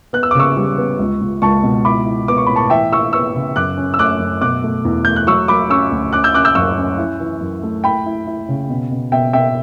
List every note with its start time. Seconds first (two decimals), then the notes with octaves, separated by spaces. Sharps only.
0.13 B3 F#6
0.23 E6
0.31 D6
0.35 C#3 C#6 E6
0.57 G3
0.78 B3
0.99 C#2
1.21 C#2
1.42 C#2 A5 C#6
1.63 B2
1.85 E4 B5 D6
2.06 E4
2.28 B3 D6
2.37 C#6
2.47 A2 B5
2.56 A5 C#6
2.70 E3 E5 G5
2.92 E3 C#6 E6
3.13 B3 C#6 E6
3.35 C#3
3.56 F#2 D6 F#6
3.77 C#4
3.94 E6
3.99 A3 D6 F#6
4.20 F#2
4.41 B2 D6 F#6
4.64 A3
4.85 E2
5.05 A3 G6
5.16 F#6
5.27 F#3 C#6 E6
5.48 F#3 B5 D6
5.70 C#4 C#6 E6
5.92 D2
6.13 C#4 D6 F#6
6.24 E6 G6
6.34 C#4 D6 F#6
6.45 E6 G6
6.55 F#2 C#6 E6
6.78 C#4
6.98 E4
7.20 E3
7.41 F#2
7.63 A3
7.84 E4 G5 B5
8.06 E4
8.27 E4
8.49 C#3
8.70 B2
8.91 B2
9.12 B2 E5 G5
9.33 B2 E5 G5